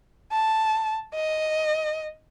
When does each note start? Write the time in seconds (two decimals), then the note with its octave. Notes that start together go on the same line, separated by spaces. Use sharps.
0.32 A5
1.15 D#5